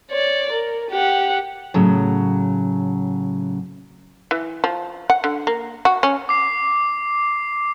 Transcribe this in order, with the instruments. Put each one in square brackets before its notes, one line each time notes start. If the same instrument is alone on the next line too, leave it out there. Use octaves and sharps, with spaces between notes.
[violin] C#5 D5
A#4
G4 F#5
[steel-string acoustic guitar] A2 C#3 F#3
[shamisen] E3
F3
F#5
D3
A#3
F#4
C#4
[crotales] D6 C7